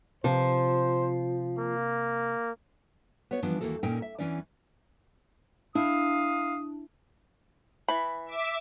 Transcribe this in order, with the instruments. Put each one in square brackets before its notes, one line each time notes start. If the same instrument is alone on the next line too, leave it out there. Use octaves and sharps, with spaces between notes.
[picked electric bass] C3 [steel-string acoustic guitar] F3 [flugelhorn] C5
[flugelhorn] A#3
[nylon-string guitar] B3 F#4 C#5
E3 F3 G3 B3 D4
D#2 E3 A#3 F#4 A4
A#2 C#4 D#4 A#4 G5
E5
E2 G#2 E3 C#4 D4 D5
[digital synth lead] D4 [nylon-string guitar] E4 [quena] F5 [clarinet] D#6
[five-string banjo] E3 B5
[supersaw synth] E5 D6